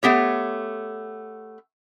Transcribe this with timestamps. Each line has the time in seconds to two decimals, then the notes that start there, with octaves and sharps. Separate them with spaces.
0.03 A3 B3 G4 C#5